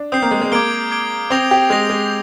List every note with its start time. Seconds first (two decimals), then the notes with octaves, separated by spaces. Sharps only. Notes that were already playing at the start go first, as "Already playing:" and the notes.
Already playing: D4
0.12 C4 D#6 G6 C7
0.22 A#3
0.31 G#3
0.42 G#3
0.52 A#3 D6 G#6 D7 G7
0.91 D6 G#6 D7 G7
1.30 C4 D#6 A#6 F7
1.51 G4
1.70 G#3 D#6 A#6 F7
1.90 G#3